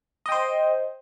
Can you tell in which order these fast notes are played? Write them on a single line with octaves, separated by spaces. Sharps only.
D#5 G5 C5